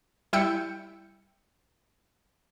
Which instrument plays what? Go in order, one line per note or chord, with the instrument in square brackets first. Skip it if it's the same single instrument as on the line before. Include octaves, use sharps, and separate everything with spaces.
[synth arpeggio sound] G3 E4 G5 E6 G6 C#7